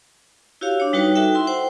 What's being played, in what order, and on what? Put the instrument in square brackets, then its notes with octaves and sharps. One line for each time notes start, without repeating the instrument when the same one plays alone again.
[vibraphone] E4 F#4 G4 C#5 F5
D4 C#5
G3 D#4 F#4 B4 C#5 G5
D#4 F#4 A4 E5 G5
E4 C6
C5 F#5 G5